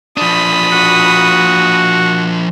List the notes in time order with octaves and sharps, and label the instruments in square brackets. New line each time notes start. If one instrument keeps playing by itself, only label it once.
[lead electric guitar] F3 D4 [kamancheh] B5 D#6
[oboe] F#4